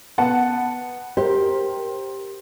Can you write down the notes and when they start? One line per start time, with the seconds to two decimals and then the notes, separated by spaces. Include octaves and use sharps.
0.18 B3 F#5 A5
1.17 G4 A#4 C5